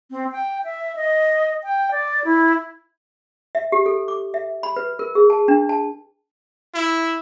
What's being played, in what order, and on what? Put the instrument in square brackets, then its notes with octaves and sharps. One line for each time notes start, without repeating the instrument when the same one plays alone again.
[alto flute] C4
G5
E5
D#5
G5
D5
E4
[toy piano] E5
G4
A4
D6
E5
B5
B4
A#4
G#4
A5
D4
A5
[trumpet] E4